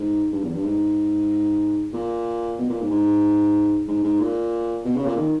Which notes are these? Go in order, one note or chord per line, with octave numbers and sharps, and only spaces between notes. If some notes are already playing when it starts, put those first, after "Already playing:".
Already playing: G#2
G2
E2
G2
G#2
A#2
B2
A#2
G#2
G#2
G#2
G#2
A#2
B2
C#3
A#2
D#3